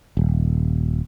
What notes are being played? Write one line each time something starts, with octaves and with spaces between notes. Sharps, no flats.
D#1